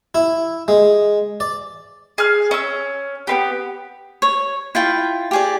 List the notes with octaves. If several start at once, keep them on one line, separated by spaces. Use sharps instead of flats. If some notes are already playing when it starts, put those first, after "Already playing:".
E4
G#3
D5
G#4 F6
C#4 E6
B3 C4 G4
C#5
E4 F4 G5
G4 G#4 D5